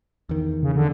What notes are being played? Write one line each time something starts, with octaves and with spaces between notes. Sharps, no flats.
E2 D#3
C#3
D3